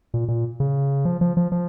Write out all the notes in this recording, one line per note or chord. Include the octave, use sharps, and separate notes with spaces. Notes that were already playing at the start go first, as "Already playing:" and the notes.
A#2
A#2
C#3
F3
F3
F3
F3